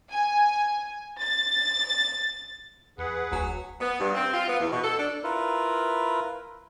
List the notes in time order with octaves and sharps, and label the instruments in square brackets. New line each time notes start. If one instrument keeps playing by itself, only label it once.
[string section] G#5
A6
[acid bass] E2 [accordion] G#4 B4 F#5
[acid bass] E1 [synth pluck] D2 G#5 [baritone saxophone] F#3
[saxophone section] B3
G2
C4
F4
B3
E2
B2
A4
D4
[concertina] E4 F4 A#4 B4